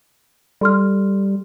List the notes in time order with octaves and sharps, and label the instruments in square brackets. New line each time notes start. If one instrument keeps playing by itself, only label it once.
[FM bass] G3 [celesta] A4 C6 F6